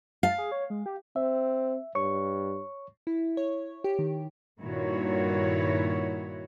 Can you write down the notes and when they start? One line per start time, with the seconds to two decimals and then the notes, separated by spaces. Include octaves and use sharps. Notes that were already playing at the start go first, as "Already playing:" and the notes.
0.23 F5 A5
0.38 G#4
0.52 C#5
0.70 G#3
0.86 G4
1.16 C4 E5
1.95 G2 C#5 C#6
3.07 E4
3.37 C#5
3.84 G4
3.99 D#3
4.60 G2 A#2 D#3 E4 F#4 C#5